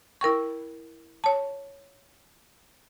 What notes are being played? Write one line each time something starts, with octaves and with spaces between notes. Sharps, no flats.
E4 A#4 G5 C#6
C#5 A5